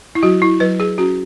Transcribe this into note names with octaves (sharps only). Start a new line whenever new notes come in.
E4
F#3 F#4
E4
F#3 B4
G#4
C#4 F#4